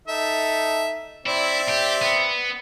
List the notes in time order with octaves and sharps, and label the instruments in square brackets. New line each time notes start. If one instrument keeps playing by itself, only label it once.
[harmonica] D#4 A4 E5
[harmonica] C4 D5 E5 [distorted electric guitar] E4
[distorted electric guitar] G4
B3